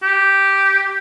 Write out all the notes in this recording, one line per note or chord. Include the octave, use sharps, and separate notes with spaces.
G4